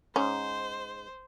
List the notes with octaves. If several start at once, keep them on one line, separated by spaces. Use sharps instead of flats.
G#2 C#4 C5